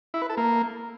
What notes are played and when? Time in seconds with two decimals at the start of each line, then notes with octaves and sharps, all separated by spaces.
0.14 E4
0.22 B4
0.29 A4
0.37 A#3